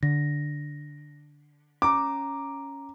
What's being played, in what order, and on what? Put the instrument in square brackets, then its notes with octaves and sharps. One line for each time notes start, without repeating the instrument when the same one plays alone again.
[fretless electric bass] D3 [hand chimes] A#6
[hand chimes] C#4 A#5 [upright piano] D6